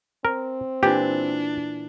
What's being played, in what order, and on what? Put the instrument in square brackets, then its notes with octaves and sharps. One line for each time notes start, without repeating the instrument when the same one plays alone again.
[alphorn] C4 [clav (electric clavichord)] A#4
[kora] A#2 E3 [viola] D4 [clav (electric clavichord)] G4